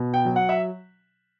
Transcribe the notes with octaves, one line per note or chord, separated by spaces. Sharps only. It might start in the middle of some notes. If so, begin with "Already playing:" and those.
Already playing: B2
G5
F#3
F#5
E5